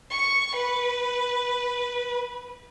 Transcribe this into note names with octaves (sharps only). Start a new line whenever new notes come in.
C#6 C#7
B4